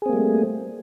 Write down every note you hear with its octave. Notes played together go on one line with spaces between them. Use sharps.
G3 A3 A#3 C4 G#4